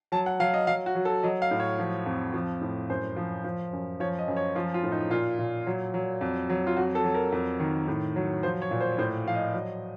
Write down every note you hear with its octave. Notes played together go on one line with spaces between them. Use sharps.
F#3 A5
F#5
F#3 F5
D#5
F#3 F5
F#4
F#3
A4
F#3 D#5
F5
A2
C#5
F3
F2
F3
A2
F#2 C5
F3
F3
F#2
F3 C#5
D#5
F#2
C#5
F3 F4
F4
A2
D#4
A#2 F4
A#2
F#3
F#3
F2
F#3
F4
F2 F#4
A4
F#3
A#4
F2
D#3
A2
F#3
F3 C5
C#5
A#2
C5
A2 C5
F3 F5
D#5
F#3